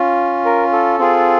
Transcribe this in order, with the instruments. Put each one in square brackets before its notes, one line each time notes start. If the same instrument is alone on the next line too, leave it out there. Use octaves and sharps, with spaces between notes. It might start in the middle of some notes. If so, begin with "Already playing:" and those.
Already playing: [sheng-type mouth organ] C#4 F4
A#4
A4
C4 F4 G#4